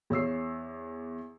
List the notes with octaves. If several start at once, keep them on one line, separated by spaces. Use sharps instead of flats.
E2 C#5 E6 C7